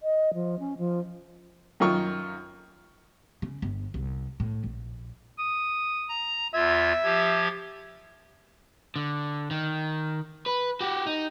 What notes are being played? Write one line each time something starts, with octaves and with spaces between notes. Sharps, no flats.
D#5
F3
C#4
F3
F#2 D#3 F4 C#6
C#3
G1
C2
A2
A#1
D#6
A#5
E2 F4 E5 G#6
F3 G4 G#6
D3
D#3
B4
F#4 G4
D#4